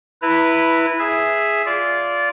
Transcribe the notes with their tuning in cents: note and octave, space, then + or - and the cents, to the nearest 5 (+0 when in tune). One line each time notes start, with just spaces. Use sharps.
E4 +0 B4 -5 A#5 -35
G#4 +0 E5 +0
F4 +0 D5 -20